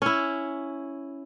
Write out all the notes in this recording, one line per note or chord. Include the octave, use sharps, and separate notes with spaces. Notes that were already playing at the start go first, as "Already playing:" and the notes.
C#4 E4